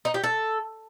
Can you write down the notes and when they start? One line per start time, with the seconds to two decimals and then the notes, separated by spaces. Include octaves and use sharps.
0.05 D#4
0.14 G4
0.23 A4